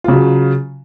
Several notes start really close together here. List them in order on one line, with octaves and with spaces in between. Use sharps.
F4 C#3 F#3